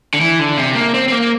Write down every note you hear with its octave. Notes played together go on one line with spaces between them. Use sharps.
D3
E3
D3
C3
A#3
C4
C4
A#3